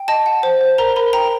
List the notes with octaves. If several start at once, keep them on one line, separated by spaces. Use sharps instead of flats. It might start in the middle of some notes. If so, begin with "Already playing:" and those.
Already playing: G5
D#5 A5
F#5
C5
C5
A#4 A#5
A#4 B5
G5 A#5